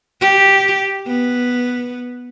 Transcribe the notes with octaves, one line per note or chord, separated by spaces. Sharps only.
G4
B3